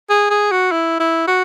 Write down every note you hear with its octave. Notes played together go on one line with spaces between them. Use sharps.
G#4
G#4
F#4
E4
E4
F#4